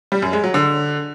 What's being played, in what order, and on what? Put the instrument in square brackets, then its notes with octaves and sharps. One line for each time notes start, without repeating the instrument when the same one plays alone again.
[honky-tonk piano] G3
F#2
G#3
F#3
D3